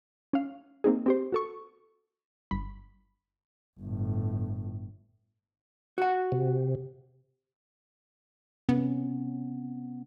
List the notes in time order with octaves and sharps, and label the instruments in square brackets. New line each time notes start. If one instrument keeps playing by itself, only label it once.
[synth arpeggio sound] C#4 F5
A#3 C4 D#4 G#4
C4 G4 C5
F#4 A4 C#6
G1 B5
[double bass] G1 A2
[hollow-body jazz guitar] F#4 F#5
[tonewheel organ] C3
[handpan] C3 C#4 [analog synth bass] B3